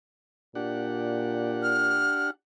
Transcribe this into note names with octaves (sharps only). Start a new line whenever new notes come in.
A#2 D4 G4 F#5
F6